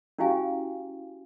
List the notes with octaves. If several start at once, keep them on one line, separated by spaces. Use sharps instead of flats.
C#4 E4 F#4 G4 F5 G#5